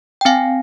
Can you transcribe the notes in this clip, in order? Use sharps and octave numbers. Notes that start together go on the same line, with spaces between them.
G5
C4 F5 G#5